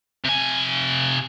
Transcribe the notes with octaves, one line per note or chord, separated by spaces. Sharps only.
C3 G#5